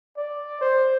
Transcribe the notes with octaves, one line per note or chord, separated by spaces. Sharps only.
D5
C5